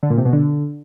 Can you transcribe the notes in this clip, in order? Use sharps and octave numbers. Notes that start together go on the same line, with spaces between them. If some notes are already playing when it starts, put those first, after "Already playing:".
D3
A#2
C3
B2
D3